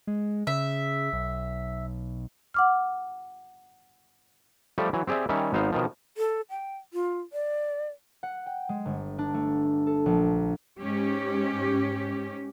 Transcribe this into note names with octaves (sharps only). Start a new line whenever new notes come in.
G#3
C#3 E5
B1
F#5 D6 F6
F3 G3 A3 G4 A4
E3 F#3
C4 G4 G#4 D5 E5
D#3 G3 C#4 E5
G#1 B3 D#4 C5 F5
B2 D#3 F3
A4
G5
F4
D5
F#5
G5
G#3
G1
D4
A3
A4
A#1
G#2 C#4 G4